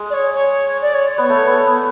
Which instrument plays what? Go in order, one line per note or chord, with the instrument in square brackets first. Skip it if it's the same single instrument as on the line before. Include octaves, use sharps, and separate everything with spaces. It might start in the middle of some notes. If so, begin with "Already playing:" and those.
Already playing: [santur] G#3
[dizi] D5
C#5
C#5
D5
C#5
[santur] B3 [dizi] C#5
[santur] A3
B3
A3
B3